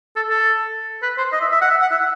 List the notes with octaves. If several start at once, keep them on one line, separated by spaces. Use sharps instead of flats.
A4
A4
B4
C5
D#5
E5
E5
F#5
E5
F#5
E5